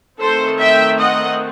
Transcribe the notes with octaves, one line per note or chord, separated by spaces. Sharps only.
D#3 A3 C4 A4 C5
E5 G5
D#5 F#5